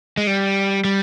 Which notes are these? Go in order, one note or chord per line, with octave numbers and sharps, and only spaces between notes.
G#3
G3
G3